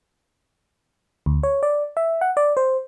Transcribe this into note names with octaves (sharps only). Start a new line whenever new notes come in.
D2
C#5
D5
E5
F#5
D5
C5